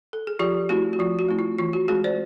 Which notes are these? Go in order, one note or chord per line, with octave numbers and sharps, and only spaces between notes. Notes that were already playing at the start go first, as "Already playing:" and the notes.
A4
G#4
F3 F4 G4
A3 C4 E4 F#4
F#4
F3 F4
F#4
A3 C4 E4
F4
E3 F4
F#4
G#3 C4 F#4 G#4
C5 D5